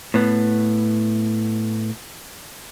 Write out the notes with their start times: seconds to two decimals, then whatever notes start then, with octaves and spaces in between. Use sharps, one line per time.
0.14 A2 B3